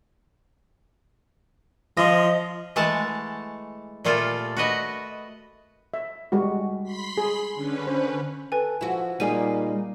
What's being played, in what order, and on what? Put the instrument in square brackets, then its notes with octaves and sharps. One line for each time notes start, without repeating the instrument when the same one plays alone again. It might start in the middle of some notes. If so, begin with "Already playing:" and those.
[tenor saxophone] F3 [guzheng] D#5
[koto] E3 G#3 A3 F#5 A5
A#2 G3 A3 F4 A4
F#4 B4 D#5
[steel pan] E5
G3 G#3 F#4
[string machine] B5 C6 B6
[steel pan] G#4
[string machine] D3 C#4 B4
[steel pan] C5
[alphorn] A4 [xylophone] B4 G#5
[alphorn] F3 [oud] E4 F#4
[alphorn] A#2 [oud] G3 A#3 G#4 [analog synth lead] D#4 [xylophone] G#5 D#7